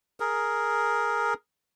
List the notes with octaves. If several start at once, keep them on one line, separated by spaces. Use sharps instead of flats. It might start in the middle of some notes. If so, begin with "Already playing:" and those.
G#4 A#4